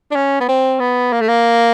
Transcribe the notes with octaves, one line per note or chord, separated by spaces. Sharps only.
D4
C#4
B3
C4
B3
A#3
A3
A#3